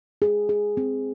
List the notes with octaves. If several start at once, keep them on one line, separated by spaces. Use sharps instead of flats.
G#4
G#4
C4